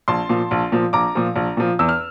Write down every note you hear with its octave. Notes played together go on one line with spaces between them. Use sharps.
A#1 A5 C6
A#2 F3
A#1
A#2 F3
A#1 A#5 D6
A#2 F3
A#1
A#2 F3
E2 E6
F6